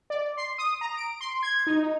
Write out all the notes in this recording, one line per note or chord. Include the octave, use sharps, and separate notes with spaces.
D5
C6
D#6
A#5
D7
C6
G#6
D#4
D#4